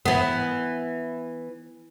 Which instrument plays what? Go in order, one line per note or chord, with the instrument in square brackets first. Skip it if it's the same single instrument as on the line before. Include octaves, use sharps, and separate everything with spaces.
[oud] E3 B3